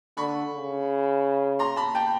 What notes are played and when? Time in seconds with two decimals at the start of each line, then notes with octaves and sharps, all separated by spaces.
0.17 D3 B5 C#6
0.54 C#3
1.59 A#5 C6
1.76 A5 B5
1.95 G5 A5